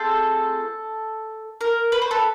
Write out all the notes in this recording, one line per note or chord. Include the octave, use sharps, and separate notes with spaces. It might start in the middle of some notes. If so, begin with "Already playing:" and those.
Already playing: A3 C4 F4 G#4 A4
A#4
B4
C5
A4 B4